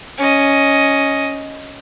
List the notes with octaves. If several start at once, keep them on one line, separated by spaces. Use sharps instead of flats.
C#4 D#5